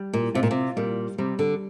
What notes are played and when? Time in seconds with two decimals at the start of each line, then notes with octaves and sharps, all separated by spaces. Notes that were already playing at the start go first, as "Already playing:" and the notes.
Already playing: G3
0.13 A#2
0.35 C3 F4
0.43 A#2
0.51 C3
0.77 A#2 G3
1.18 C3 G3
1.39 D3